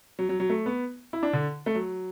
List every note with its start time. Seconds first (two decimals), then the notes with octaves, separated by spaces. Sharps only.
0.19 F#3
0.29 F#3
0.40 F#3
0.50 A3
0.66 B3
1.13 E4
1.23 D4
1.33 D3
1.66 A3
1.75 F#3